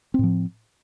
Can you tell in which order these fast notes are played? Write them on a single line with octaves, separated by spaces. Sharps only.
C4 A2 F3